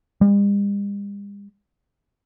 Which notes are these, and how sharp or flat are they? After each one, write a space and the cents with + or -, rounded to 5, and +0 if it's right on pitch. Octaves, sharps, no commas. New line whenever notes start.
G3 +45